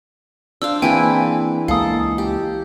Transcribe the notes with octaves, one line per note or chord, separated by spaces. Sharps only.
D4 C5 F5 E6
E3 A#3 C4 E4 G#4 G5 G#5
C#2 G#3 A#3 A4 F5 D#6
G4